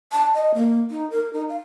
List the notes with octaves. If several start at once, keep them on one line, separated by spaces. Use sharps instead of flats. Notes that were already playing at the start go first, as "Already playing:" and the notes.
A5
D#5
A#3
D#4
A#4
D#4
F5